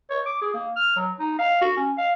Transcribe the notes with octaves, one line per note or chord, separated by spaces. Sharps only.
C#5
D6
G#4
A#3
F6
F#3
D#4
F5
F#4
C#4
F5